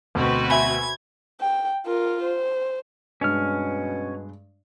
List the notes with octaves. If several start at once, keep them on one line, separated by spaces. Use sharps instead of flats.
D2 B2 C4 F#4 B4
E5 G#5 B5 G#6
G5
F4 A#4
C5
G2 B2 G#3 C#4 D4 F6